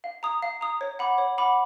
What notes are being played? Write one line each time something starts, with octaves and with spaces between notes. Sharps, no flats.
F5
A#5 D#6
F5
A#5 D#6
C#5
F#5 B5 D6
C#5
F#5 B5 D6